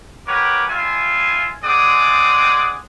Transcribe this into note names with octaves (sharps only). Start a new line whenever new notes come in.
G4 A#4 B4 C#5 F#5 D6
G3 F4 E5 G#5
G#3 C4 G#4 D5 F#5 D#6